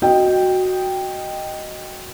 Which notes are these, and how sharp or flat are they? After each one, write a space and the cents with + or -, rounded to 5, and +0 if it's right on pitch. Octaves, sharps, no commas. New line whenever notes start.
F#4 +0 D#5 -5 G5 +0